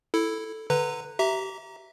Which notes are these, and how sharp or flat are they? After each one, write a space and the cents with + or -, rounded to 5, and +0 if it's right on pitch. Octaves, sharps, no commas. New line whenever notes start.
E4 +0 A4 +0
D3 +0 B4 +0 A#5 -20
G4 -30 E5 +0 A#5 +0